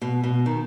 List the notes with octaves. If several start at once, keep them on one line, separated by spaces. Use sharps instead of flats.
B2
B2
D#3